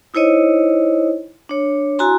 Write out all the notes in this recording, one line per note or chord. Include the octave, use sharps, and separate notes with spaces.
D#4 E4 C5 C#5 D#5
D4 C#5
E4 F#4 G#5 A#5 C6